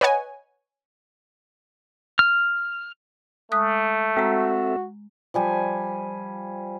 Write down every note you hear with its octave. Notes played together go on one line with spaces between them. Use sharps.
B4 C#5 D#5 F#5 G#5
F6
G#3 A3 D#6 F#6
G#3 C4 F#4 A4 E5 A#5
F3 G3 G#5